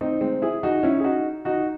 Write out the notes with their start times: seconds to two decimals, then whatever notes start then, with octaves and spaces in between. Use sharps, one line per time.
0.01 C4 D#4
0.21 G#3 C4
0.42 E4 G#4
0.63 D#4 F#4
0.83 C#4 E4
1.00 G#4
1.04 D#4 F#4
1.45 D#4 F#4